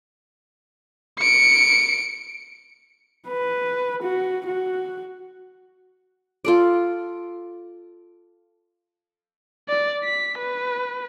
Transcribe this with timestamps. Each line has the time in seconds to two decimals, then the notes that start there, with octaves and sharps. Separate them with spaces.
1.19 C#7 D7
3.28 B4
4.03 F#4
4.46 F#4
6.45 F4 A4 D5
9.69 D5
10.04 B6
10.38 B4